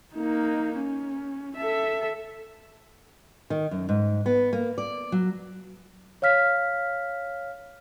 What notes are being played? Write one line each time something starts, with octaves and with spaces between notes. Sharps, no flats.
A#3 D#4
C#4
A4 E5
D#3
F#2
G#2
B3
A#3
D5
F#3
C#5 F5 F6 B6